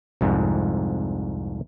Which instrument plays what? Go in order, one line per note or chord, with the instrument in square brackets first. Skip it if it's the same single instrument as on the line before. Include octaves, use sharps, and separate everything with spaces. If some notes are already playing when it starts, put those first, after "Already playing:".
[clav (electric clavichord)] C2 F2 G#2